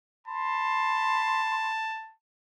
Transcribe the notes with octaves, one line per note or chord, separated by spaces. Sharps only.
A5 B5 C6